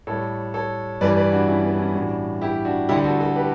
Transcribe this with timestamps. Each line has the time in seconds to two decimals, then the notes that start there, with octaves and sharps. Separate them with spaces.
0.07 A2 G3 A4 C#5
0.54 A4 C#5
1.01 G2 E3 G3 B4 D5
1.17 B4 D5
1.32 D4 F#4
1.48 C#4 E4
1.64 B3 D4
1.79 C#4 E4
1.95 A2 E3 G3 D4 F#4
2.41 E4 G4
2.65 D4 F#4
2.89 D2 D3 G3 E4 G4
3.04 F#4 A4
3.20 F#4 A4
3.36 G4 B4